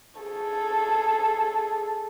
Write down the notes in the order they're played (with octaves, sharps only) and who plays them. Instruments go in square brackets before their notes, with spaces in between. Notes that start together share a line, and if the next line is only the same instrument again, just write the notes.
[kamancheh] G#4 A4